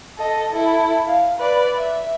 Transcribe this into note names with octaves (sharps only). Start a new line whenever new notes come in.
A4 D#5
E4 A4
F5
B4 D5
E5